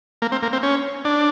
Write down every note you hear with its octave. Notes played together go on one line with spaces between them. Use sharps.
A#3
C4
A#3
C4
C#4
D4